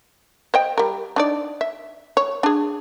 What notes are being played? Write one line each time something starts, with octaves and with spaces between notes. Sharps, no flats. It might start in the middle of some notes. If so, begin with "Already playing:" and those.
C5 D#5 G5
G3 A#4
D4 D#4 D5
E5
C#5
D4 G#4